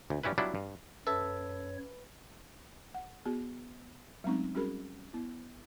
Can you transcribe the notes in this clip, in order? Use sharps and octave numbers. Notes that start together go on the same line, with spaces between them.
D2
G2 G3 C#4 E4 B4
F#3 G3 B3 D4 E4 F4
G2
F#2 A4 B4 C#5 E5
F#5
B3 F#4 G#4
F#3 G#3 A3 C4 C#4 D#4
G3 C#4 F#4 G#4 A#4 B5
B3 E4